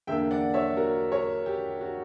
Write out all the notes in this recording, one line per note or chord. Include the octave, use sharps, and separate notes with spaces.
E2 D3 A#3 D4 E5 G5
D5 F#5
C#5 E5
F#4 A#4
A#4 C#5
G4
F#4